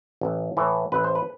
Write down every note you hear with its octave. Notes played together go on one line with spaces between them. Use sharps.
A1
A2 E3
A1 B4
C5
B4